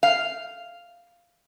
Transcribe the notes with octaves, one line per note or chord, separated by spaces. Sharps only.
F5